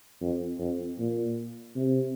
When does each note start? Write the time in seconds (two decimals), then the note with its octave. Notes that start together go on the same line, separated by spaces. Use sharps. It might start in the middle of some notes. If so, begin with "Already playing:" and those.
0.21 F2
0.59 F2
0.99 A#2
1.76 C3